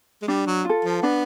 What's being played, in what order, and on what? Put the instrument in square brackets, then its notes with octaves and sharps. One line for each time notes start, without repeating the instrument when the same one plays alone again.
[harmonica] G#3
[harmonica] G3 [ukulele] D4
[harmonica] F#3
[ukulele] F4 A4
[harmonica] F3
[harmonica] B3 [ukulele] D4